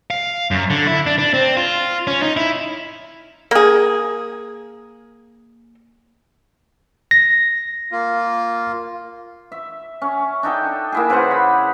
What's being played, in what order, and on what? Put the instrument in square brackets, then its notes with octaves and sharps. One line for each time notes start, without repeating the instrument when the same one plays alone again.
[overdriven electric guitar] F5
F#2
D3
E4
D4
D4
C4
F4
C#4
D#4
E4
[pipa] A#3 G#4
[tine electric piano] A#6
[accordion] A#3 F4
[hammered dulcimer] E5
C#4
D4 D#4 A4 G5
A#3 E4 G#4
C#3 B4 C5 F#5
B5